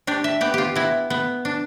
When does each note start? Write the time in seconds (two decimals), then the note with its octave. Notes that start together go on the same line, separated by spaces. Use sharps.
0.07 D4 G4
0.24 E5
0.41 B3 G4
0.54 F4 G4
0.76 B3 E4
1.10 B3
1.45 D4